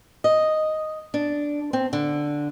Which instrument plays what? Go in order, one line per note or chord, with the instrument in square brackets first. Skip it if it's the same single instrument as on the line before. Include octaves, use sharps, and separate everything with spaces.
[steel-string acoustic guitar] D#5
D4
C4
D3